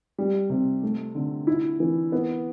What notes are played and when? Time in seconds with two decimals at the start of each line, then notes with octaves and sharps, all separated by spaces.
0.18 G3
0.50 C3
0.83 A3
1.15 D3
1.47 E4
1.80 E3
2.12 B3